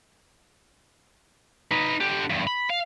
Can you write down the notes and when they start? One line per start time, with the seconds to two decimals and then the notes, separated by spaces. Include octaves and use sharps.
1.71 D#4 B4
2.01 D3 G4
2.30 E2 G2
2.47 B5
2.70 F5